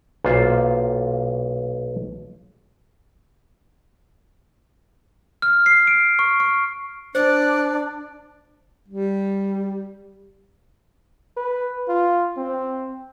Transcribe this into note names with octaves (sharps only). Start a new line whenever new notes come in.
B1 A#2 F4 C5
F6
C7
D7
C#6
C#6
D4 C5 D5 F#6
G3
B4
F4
C4